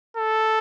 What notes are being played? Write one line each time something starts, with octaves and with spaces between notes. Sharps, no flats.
A4